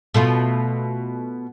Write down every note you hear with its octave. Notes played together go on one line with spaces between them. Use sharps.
B2 A3 F4